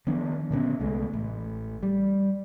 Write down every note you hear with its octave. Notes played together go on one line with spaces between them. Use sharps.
D#3 F3 B3 D4
A#2 D3 B3 C#4
C2 G#3 A3
A1
G3